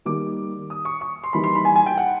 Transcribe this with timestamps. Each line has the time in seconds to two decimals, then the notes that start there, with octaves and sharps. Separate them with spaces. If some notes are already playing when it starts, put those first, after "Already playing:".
0.05 D#3 G3 A#3 D6
0.70 D#6
0.85 C#6
1.01 C#6
1.24 C6
1.33 E3 G3 A#3 D#4 B5
1.44 C6
1.55 B5
1.65 G#5
1.75 G#5
1.86 G5
1.97 F#5